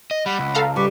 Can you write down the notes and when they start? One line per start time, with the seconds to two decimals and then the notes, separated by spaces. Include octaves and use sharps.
0.11 D#5
0.26 G3 F#5 B5
0.39 C#2
0.55 A4 F5 A#5
0.76 G3 G4 B4 C#6